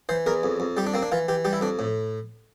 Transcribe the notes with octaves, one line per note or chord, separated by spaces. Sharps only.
E3 C5
E2 A#4
F2
F2
G3 G4
D4
A#3 C4
D4
E3 F4
E3 G4
G3 G4
E4
F2 D4
A2